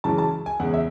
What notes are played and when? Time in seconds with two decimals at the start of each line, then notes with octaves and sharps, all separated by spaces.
0.04 F#2 C#3 E3 G#3 A5
0.18 A5
0.46 G#5
0.60 E2 C#3 G#3 F#5
0.74 E5